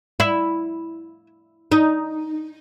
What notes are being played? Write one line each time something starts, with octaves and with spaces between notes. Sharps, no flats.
E4
D#4